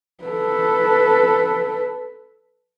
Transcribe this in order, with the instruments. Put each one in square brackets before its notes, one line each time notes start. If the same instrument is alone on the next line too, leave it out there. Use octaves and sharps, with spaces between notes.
[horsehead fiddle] A4 B4